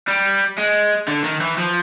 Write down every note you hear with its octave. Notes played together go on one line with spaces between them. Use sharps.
G3
G#3
D3
D#3
E3
F3